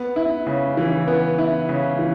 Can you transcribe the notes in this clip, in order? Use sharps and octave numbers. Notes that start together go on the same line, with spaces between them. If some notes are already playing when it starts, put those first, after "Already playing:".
Already playing: B3
E4
C#3
E3
B3
E4
C#3
E3